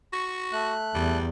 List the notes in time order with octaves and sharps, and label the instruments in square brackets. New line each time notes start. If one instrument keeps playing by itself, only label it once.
[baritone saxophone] F#4 [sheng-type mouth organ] C#6
[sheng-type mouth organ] A3 F#6
[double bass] E2 [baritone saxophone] G3